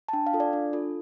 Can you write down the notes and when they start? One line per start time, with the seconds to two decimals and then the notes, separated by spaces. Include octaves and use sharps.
0.09 A5
0.13 D4 G5
0.26 F5
0.33 F4 A4
0.40 D5
0.53 D4
0.73 F4 A4